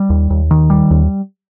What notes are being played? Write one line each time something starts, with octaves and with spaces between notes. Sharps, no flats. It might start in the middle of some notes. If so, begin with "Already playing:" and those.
Already playing: G3
D#2
D#2
D#3
G3
D#2